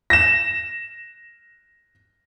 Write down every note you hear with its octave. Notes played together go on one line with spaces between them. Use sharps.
A#6 E7